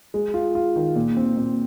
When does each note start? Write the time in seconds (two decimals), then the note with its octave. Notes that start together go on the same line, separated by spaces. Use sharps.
0.14 G#3
0.34 F4
0.55 F4
0.76 D#3
0.96 A#2
1.17 C4
1.37 A#2